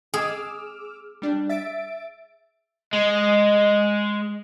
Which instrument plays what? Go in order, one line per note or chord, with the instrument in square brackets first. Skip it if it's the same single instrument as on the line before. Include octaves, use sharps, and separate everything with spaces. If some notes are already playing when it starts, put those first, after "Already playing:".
[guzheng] G#4 [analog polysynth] D6 E6 F6
[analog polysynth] G3 D4
E5 A6 D7
[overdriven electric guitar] G#3 [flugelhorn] D#5